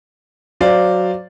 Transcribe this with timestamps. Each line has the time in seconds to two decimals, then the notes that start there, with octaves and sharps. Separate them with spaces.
0.60 F#3 C5 D5 F5